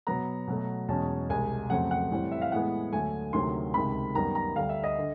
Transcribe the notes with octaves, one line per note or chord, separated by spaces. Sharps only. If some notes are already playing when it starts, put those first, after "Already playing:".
B2 F#3 B3 A#5
B2 F#3 A3
E2 B2 G#3 C#4 A5
C2 B2 G#3 G#5
F2 C#3 F#3 A3 C4 F#5
F#5
A2 E3 G3 C4
E5
F5
A2 E3 G#3 B3 F#5
D2 D3 F#3 A3 G#5
D2 C3 D#3 F#3 A3 C6
C#2 C3 D#3 G#3 C4 B5
F#2 D#3 G3 B3 A#5
A#5
D2 D3 G3 F5
E5
D#5
D3